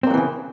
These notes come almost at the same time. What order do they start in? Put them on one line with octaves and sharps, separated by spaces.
C4 A#3 F#3 E3 C#3